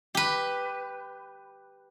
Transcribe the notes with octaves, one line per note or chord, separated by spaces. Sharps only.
G4 B4